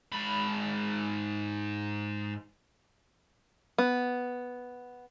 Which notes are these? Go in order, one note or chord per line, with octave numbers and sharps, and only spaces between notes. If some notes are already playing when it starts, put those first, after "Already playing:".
G#2 B5
B3